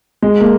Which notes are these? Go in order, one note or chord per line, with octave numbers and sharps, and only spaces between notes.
G#3
A#3